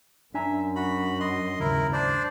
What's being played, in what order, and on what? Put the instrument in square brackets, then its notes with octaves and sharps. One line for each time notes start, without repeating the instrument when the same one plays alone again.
[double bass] F#2 [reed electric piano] D4 G#5 A#5 [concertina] E5
[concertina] F#4 B5
D#5 C6
[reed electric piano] D#2 G#2 C#3 [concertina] E4 A#4
[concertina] D4 C5 D5